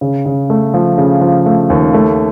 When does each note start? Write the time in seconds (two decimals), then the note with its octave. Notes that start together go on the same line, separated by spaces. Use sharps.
0.01 C#3
0.26 C#3
0.50 A3
0.74 F3
0.98 C#3
1.21 F3
1.46 A3
1.70 D#2
1.94 A3